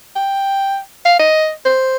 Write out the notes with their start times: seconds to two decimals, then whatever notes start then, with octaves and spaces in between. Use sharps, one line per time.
0.16 G5
1.05 F5
1.20 D#5
1.66 C5